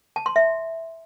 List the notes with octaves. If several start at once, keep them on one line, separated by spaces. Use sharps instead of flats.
A5
C6
E5